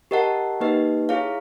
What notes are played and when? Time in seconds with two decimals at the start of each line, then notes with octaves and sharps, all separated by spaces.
0.11 G4 A#4 D#5 F#5 A5
0.60 A#3 D#4 G4 B4 D#5
1.09 E4 G#4 C#5 F5